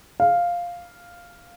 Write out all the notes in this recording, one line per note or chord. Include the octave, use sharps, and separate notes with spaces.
F5